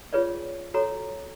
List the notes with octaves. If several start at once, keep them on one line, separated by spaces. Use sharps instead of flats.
F4 G#4 B4 C#5 D5
F#4 A4 C#5 A#5